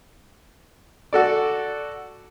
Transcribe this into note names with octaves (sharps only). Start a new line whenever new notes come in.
F#4 A4 D5